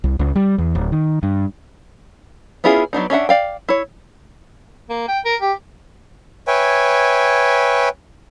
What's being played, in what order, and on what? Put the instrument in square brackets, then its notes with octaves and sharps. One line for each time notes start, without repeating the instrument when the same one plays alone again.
[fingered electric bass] C2
C#2
G3
E2
D1
D#3
G2
[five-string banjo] B3 C#4 E4 F4 G#4
F#3 B3 D4 D#4
C#4 D4 E5 F#5
D5 F5 G5
E4 C#5
[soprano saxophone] A#3
G5
A#4
G4
[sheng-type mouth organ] B4 C#5 E5 G5 G#5